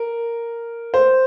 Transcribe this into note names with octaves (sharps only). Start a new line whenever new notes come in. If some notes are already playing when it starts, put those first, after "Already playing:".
Already playing: A#4
C5